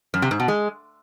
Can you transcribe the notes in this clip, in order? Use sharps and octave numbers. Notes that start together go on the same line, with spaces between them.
F#2
C3
G#2
B2
G#3